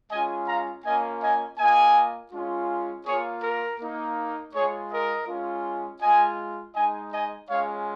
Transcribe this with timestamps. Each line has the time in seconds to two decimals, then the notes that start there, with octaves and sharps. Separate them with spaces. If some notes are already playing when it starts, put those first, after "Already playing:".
0.10 G#3 C#4 F4 D#5 G#5
0.47 F5 A#5
0.84 A#3 C#4 F4 D#5 G#5
1.22 D#5 G#5
1.58 A#3 F4 D#5 G#5
2.32 G#3 C#4 F4
3.06 A#3 F4 G#4 C#5
3.43 A#4
3.80 A#3 D#4
4.54 G#3 F4 G#4 C#5
4.90 A#4 D#5
5.27 G#3 C#4 F4
6.01 G#3 F4 D#5 G#5
6.75 G#3 D#4 D#5 G#5
7.12 D#5 G#5
7.49 G#3 C#4 F4 C#5 F5